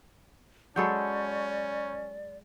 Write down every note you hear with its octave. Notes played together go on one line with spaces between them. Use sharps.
F#3 G#3 C#4 A4 D5 B5 C#6 G6